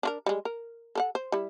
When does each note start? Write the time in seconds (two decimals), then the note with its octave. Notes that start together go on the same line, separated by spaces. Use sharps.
0.03 D4 F4 A#4
0.26 G3 G#3
0.45 A#4
0.95 A4 A#4 F#5
1.15 C5
1.32 G3 E4